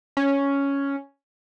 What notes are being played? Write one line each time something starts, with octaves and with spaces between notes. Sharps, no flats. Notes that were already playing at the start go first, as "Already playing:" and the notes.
C#4